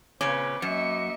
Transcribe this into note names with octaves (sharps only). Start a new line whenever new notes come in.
A#2 C#3 C4 C#4 B4 D6 D7
F#2 A#3 D#5 E5 C#7